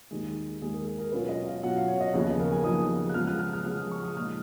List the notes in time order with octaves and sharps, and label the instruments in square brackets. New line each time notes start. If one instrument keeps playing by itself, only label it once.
[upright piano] D#2 D#3 G#3
D#2 D#3 G#3 G#4
A#4
G#4
A#4
B2 F#3 C#4 F4 B4
D#5
F5
B2 F#3 C#4 F4 F#5
F5
C#5
D#5
D#2 C#3 F3 B3 D#4
G#4
A#4
G#5
D#2 C#3 F3 B3 D#4 D#6
F#6
C#3 F3 G#3 B3 F4 F6
F#6
F6
F6
C#3 F3 G#3 B3 F4 D#6
C#6
D#6
A#2 G#3 D#4 F6